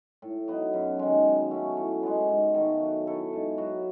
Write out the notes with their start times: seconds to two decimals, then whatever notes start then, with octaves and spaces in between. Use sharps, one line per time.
0.22 A2
0.48 F#3 B3 D#4
0.74 F#2
0.99 D#3 G#3
1.25 F#3
1.51 A3 C#4
1.77 A2
2.03 G#3 B3
2.29 G#2
2.54 D#3 A3
2.80 F#3
3.07 A3 E4 A4
3.33 G#2
3.58 F#3 B3 F#4